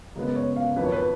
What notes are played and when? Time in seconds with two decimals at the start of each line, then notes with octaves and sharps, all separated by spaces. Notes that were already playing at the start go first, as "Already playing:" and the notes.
0.15 F#2 C#3 G#3 B3
0.35 C#5
0.56 F5
0.76 F2 D#3 F#3 B4
0.84 C#5
0.92 B4